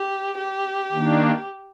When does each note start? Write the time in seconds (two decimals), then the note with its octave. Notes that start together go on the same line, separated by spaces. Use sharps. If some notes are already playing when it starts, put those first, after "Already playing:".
Already playing: G4
0.38 G4
0.92 D#3 A#3 D4